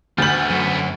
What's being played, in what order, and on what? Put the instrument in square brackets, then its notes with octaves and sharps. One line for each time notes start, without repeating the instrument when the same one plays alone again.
[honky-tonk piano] D2 F#7 [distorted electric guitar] A3 B3 [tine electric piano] F6 G6 A6
[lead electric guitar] F#2